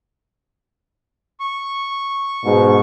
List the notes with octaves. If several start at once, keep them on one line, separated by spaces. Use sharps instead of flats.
C#6
G#2 B2